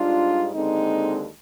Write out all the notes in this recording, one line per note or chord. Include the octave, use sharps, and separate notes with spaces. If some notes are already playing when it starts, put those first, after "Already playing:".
Already playing: G#2 G3 D4 F4
D#2 D3 G#3 C4 D#4